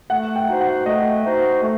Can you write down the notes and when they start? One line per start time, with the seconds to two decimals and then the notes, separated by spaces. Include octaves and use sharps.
0.10 A3 F#5
0.36 G5
0.48 D#4 F#4 C5
0.61 F#5
0.86 A3 D#5
1.24 D#4 F#4 C5
1.62 A3